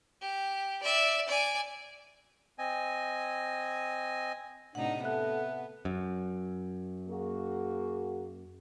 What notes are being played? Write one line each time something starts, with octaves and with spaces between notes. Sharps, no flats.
G4
D5 E5
D5 G#5
C4 D#5 G#5
A2 C3 D4 D#4 F#5
B3 A4 E5 F#6
F#2
A#3 F#4 G#4